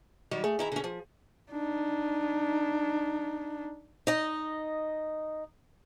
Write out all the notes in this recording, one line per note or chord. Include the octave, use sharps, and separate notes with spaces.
D#3 F#3 G3
A3 G#4
D#3 E4 A#5
D3 C#4
F3
D4 D#4
D#4 D#5